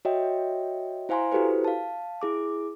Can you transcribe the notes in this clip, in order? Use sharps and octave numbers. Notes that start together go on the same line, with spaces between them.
F#4 C#5 D#5 E5 G5
E4 C5 F5 G#5 A#5 C6
E4 F#4 G4 A4 B4 C5
F5 A5
E4 G#4 D6